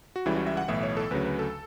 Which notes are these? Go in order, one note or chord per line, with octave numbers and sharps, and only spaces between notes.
F#4
C#2 C#3 E3 G3 E4
F#4
E5
F#5
B1 A2 E3 E5
C#5
A4
D2 C#3 F#3 B4
B4
A4